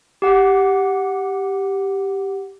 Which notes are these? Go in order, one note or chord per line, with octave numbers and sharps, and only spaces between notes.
G4 F#5 D6